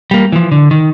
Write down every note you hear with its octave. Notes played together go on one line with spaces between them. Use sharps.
G3 A#3
E3 F3
D3
D#3